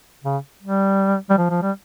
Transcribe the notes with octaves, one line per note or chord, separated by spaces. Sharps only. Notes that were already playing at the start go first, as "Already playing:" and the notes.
C#3
G3
G3
F3
F3
G3